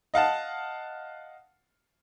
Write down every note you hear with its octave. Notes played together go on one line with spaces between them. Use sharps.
D#5 F5 F#5 A5